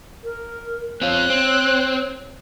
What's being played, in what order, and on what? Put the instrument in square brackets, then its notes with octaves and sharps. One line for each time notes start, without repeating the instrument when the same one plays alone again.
[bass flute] A#4
[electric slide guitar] C4 F4 [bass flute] C#5 [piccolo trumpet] F#6
[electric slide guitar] C4